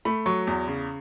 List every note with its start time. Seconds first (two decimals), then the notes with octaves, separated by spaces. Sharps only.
0.05 A3 B5
0.26 F#3 C#6
0.47 E2
0.68 C#3